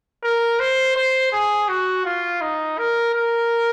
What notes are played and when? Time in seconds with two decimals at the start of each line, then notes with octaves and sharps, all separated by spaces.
0.23 A#4
0.60 C5
0.96 C5
1.33 G#4
1.69 F#4
2.05 F4
2.42 D#4
2.79 A#4
3.14 A#4